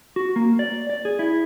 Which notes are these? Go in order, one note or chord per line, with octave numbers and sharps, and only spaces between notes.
F#4
A#3
D5
D5
G#4
E4